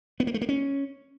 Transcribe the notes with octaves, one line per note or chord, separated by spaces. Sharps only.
B3
A#3
A3
A#3
C#4